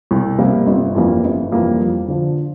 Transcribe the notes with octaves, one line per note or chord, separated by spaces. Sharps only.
C2
C3 G3 A#3
G1
F2 E3 G3 A#3
G1
F2 E3 G3 A#3
F2
D3 F3